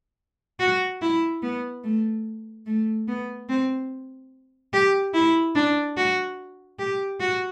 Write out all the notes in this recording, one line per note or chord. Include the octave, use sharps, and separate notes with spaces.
F#4
E4
B3
A3
A3
B3
C4
G4
E4
D4
F#4
G4
F#4